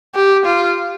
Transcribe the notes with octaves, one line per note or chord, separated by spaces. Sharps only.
G4
F4